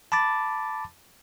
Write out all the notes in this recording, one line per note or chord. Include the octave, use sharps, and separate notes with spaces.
A5 B5 D6 A6